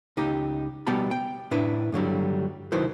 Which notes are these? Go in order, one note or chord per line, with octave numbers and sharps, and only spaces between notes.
C#2 D#4 G4
B2 G3 B3 G5 A5 B5
G5
A2 D4 E4 B4
G2 D3 F#3 G3
C2 D#3 F#3 E4 B4 C5